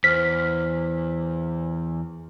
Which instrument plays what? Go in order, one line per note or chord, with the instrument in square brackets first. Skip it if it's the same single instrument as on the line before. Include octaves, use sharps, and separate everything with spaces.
[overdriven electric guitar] E2 [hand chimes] C5 F6 [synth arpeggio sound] B6